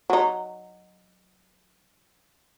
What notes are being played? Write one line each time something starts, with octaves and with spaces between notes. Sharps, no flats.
F#3 D#4